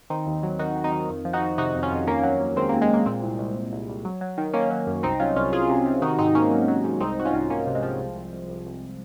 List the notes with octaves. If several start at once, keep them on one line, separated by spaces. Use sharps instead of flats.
D#3 C4 D#4
D#2
F#3
D#3 D#4 F#4
D#3
C4 D#4
D#3
F2
F3
D#4 F#4
F3
C3 D#4 F#4
F2
C#4 F4
F2
D#2 A#3 C#4
F#3
D#2
D#3 G#3 C4
A#3
D#2
G#3
D#2 A#3
A#2 G#3 C4
C2
C2
C2
C2
C2
F#3
F#3
D#3
D#3 A#3 C#4
F#3
F#2
C2 C4 D#4
F#3 C#4 F4
C2 C#4 F4
C2 F4 G#4
C3
C3
D#3 D#4 F#4
G#2 C4 D#4
G#2 A#3 C#4
F#3
F#3
G#2
C2 C4 D#4
C2 F#4
C#4 F4
C2
C2 A#3 C#4
C3
G#3 C4
F3
C2
C2
C2
C2
C2